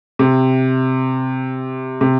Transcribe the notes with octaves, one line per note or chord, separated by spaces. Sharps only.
C3
C3